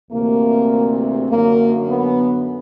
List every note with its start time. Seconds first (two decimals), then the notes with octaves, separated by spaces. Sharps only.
0.10 D2 C3 E3 A#3
1.30 F#2 D3 A#3
1.89 B3